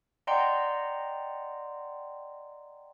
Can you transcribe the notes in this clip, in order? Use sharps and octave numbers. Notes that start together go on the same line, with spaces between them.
D5 D#5 F#5 G5 A#5 C6